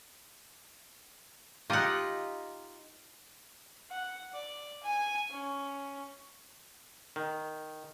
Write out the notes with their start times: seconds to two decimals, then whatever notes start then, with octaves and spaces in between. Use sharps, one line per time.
1.70 D#4 F4 G4 D#5 F#5
3.90 F#5
4.34 D5
4.83 G#5
5.31 C#4
7.16 D#3